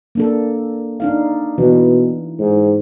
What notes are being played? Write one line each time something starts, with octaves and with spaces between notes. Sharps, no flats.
A#3 D4 A4
D4 D#4 F5
B2 E3
G#2